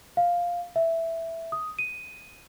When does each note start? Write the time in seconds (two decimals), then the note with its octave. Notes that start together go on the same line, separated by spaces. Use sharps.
0.17 F5
0.76 E5
1.52 D#6
1.79 D#7